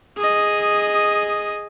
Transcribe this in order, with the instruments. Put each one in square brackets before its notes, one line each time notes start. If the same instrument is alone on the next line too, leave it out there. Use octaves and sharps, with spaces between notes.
[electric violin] G#4 D#5